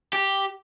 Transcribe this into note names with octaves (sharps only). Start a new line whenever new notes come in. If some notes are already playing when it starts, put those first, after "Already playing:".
G4